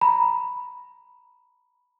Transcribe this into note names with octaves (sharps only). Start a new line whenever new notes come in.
A#5 B5